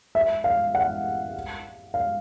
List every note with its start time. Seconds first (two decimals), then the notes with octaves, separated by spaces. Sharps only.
0.15 E5
0.44 F5
0.75 F#5
1.94 F5